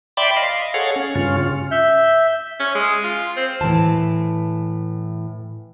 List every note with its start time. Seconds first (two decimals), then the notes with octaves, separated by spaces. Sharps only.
0.17 D5 E5 G5 B5 C6 D6
0.36 D#5 F5 C6
0.74 G#4 A4 C#5 F5 F#5
0.96 C#4
1.15 G2 C#3 C#4 F4
1.71 E5 G6
2.60 C#4
2.75 G#3
3.04 F4
3.37 C4
3.61 A2 E3 F3 A5